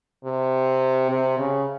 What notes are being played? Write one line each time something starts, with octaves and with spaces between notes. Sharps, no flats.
C3
C3
C#3